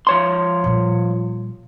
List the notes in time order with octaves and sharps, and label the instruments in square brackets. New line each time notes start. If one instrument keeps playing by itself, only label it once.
[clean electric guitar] F3 C#5 C6
[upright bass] A#2 G3